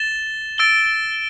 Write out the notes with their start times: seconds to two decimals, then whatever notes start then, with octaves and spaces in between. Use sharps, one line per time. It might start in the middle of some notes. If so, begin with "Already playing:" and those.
Already playing: A6 E7 G7
0.58 E6 A6 D7 G7